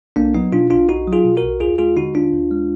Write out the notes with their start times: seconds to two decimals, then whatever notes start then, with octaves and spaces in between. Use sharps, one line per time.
0.16 B1 A#3 D4
0.34 F#3 B3 D#4
0.52 B2 D4 F4
0.70 B1 D4 F4
0.89 B1 D#4 F#4
1.07 F#3
1.13 F4 G#4
1.24 B2
1.37 F#4 A#4
1.43 B1
1.60 D#2 F4 G#4
1.78 G#3 F4 G#4
1.97 D3 D#4 F#4
2.15 D#2 D4 F4
2.33 D#2
2.51 G#3